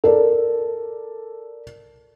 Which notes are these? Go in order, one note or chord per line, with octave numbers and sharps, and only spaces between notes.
A4 A#4 D5